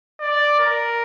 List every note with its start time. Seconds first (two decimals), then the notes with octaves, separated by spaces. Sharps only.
0.20 D5
0.59 A#4